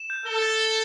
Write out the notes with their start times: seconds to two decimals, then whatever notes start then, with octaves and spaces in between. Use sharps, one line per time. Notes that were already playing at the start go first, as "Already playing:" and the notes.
Already playing: E7
0.10 G6
0.26 A4 G7
0.42 A6
0.60 G7